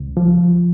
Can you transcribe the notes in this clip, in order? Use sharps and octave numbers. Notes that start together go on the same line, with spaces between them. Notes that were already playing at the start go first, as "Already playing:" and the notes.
Already playing: C#2
F3